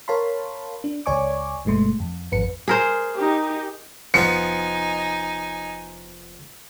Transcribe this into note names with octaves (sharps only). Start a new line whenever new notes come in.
A#4 C#5 F5 A5 B5 C6
D4
C#2 C#5 D5 G#5 C#6 D6
G1 B2 G#3 A3 C6
F2
G#1 F2 B4 C#7
G#4 A#4 C5
D#4 G4
F1 F3 B3 D#4 G#5 C#7